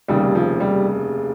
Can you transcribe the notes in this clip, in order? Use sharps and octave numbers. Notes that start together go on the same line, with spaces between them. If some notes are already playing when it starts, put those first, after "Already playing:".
F1 D#2 C#3 G3
F3
G3